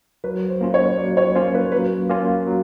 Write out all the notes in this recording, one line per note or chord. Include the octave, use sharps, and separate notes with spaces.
F#3 B4
C5
A#3 C#4 F4
C#5
F#3 D5
C#5
A#3 C#4 F4 C5
B4
F#3 B4
A#3 C#4 F4
F#3